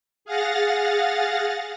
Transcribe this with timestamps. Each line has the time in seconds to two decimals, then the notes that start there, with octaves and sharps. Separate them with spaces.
0.25 G#4 F5 F#5 A6 A#6